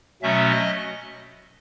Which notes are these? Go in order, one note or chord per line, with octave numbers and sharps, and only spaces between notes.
B2 F#3 A3 C#4 E5
D#5